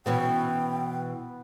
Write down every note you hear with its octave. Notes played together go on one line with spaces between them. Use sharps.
B2 E3 B3 C#4 G5